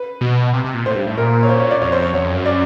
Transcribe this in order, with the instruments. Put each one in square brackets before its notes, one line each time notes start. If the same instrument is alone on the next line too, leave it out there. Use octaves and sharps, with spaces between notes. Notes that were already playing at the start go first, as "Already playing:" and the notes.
Already playing: [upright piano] B4
[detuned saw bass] B2
C3
C3
A#2
[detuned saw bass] A2 [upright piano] C5
[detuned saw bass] G2
A2
[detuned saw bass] A#2 [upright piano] A#4
[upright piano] C#5
C5
C#5
D5
[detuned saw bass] F2 [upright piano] C#5
[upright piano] C5
C#5
[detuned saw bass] E2 [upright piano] C#5
[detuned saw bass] F2
F#2
[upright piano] D5